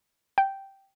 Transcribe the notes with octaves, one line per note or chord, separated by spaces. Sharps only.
G5